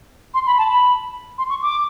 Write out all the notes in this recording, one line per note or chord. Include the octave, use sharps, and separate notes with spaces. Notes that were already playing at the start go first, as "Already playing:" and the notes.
C6
B5
A5
B5
C6
C#6
D6